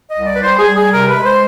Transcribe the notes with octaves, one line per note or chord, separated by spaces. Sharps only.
D#5
C2
D5
B4
G3 C5
G#4
G3
G#4
C3 A#4
B4
G#3
C5